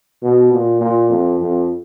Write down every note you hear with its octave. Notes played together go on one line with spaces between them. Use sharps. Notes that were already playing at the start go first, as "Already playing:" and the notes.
B2
A#2
A#2
F2
F2